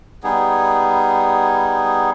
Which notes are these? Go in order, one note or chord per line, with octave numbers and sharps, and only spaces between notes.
G3 B3 D#4 G#4